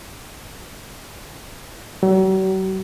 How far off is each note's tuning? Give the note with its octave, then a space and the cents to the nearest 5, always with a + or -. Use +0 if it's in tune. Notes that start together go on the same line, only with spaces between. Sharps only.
F#3 +45